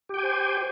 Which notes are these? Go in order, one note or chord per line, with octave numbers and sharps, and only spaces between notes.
G4 C5 G5 G#5